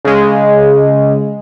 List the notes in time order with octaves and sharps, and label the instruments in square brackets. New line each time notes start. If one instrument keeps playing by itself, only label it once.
[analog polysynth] C#3 G#3